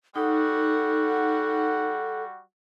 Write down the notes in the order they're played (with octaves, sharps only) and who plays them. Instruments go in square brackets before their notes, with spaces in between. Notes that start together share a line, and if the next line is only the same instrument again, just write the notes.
[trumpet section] G3 F#4 F#5 [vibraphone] D#4 [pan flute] A4